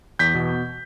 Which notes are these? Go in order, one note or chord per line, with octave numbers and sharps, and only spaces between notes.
E2 G6 B6
B2